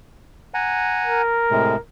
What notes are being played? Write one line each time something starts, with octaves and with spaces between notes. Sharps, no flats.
F#5 G#5 A#5
A#4
A2 C3 G#3